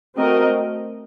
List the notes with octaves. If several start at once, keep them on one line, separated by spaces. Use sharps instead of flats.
A3 C4 F#4 A#4 D#5